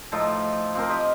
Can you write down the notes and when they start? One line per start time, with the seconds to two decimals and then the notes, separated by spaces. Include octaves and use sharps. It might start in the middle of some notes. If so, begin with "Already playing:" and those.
0.12 A2 F3 D#4 A4
0.75 F3 C4 A#4
0.90 G4 D#5